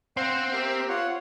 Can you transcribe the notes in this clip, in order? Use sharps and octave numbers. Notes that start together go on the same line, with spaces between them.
C4 C5 F5 F#5
G4 A#4 E5
F4 C#5 F#5